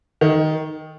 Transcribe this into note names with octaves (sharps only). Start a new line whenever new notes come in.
D#3